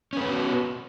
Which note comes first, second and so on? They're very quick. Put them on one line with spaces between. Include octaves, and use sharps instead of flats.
C#4 B4 A#3 B3 F#4